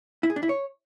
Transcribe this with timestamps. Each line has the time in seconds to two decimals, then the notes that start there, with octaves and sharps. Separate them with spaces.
0.23 E4
0.30 G#4
0.36 D4
0.43 E4
0.49 C#5